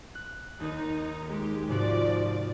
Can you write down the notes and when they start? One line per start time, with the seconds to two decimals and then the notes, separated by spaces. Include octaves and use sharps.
0.15 F#6
0.60 D#2 D#4
1.28 G#3 G4
1.68 G#2 C3 F3 F#4 D5